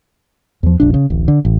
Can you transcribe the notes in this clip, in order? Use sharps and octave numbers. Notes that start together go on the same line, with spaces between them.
E2 F3
E1 A#1 D4
C#3
D1 A1
D3
A1